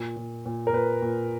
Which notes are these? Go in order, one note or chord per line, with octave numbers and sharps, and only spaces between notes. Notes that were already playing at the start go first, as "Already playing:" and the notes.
Already playing: A#2
A#2
A#2
A#4
A#2 B4
A#2